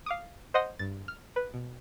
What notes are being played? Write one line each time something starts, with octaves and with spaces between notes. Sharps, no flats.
F5 D6 D#6
C5 D#5 F#5 C6 D#6 A#6
G2 A6
F6
B4
B2